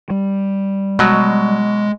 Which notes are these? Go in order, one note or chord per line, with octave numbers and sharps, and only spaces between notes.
G3
B2 F#3 G#3